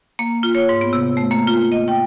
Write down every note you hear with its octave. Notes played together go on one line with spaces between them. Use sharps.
A#3
F4
C#5
G#2
B3
C3
A3
A#3
F4
D#5
G5